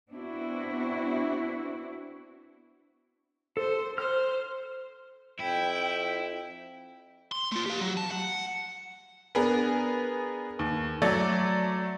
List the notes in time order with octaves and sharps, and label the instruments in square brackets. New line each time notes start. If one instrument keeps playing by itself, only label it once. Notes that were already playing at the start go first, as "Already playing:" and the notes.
[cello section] B3 C4 D4 E4 F#4
[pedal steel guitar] A4 [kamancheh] C5
[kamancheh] C5 [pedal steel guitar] F6
[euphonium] F2 [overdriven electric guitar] E4 [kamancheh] G5
[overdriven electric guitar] C6
A3 F4
G4 F5
F#3
A5
F#5
[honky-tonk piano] B3 D4 G#4 A#4 B4
D#2
F#3 A3 A4 D5